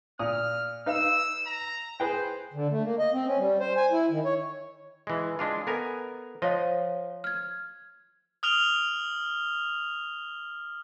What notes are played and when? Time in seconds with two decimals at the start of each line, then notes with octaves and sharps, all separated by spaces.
0.19 A#2 D#6 F6
0.86 D#4 B4 F5 E6
1.46 A#5
2.00 G#4 B4 C5 G5
2.54 D3
2.71 A3
2.84 A#3
2.99 D#5
3.13 C4
3.26 C#4
3.38 G3
3.60 C5
3.77 G#5
3.92 E4
4.10 D#3
4.25 C#5
5.07 E3 G#3
5.39 G#3 D4 F4
5.67 B3 A4 A#4 G#5
6.42 F3 C5 C#5 D#5 F5
7.24 F6 G#6
8.43 D#6 F6 F7 G7